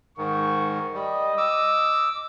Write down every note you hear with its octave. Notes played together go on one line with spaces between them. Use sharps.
G#2 D#3 C#6
G3 D#5
D6 E6